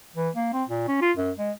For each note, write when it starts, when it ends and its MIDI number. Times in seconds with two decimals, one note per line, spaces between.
0.16 0.29 52
0.35 0.48 58
0.53 0.64 60
0.68 0.83 46
0.88 0.99 61
1.02 1.12 65
1.17 1.31 42
1.38 1.51 56